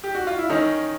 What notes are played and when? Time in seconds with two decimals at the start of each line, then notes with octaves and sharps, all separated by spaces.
0.04 G4
0.15 F#4
0.27 F4
0.38 E4
0.50 D#3 C#4 D#4